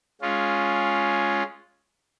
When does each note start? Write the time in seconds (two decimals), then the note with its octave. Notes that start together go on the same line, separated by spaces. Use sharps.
0.21 G#3 C#4 F4